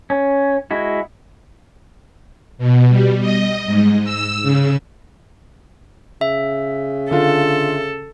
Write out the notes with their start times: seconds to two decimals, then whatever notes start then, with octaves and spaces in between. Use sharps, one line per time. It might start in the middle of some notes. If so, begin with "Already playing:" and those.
0.10 C#4
0.71 G#3 E4 F#4
2.58 B2
2.89 G3
3.21 D#5
3.65 G#2
4.04 E6
4.42 C#3
6.21 C#3 E5
7.11 D3 F4 A4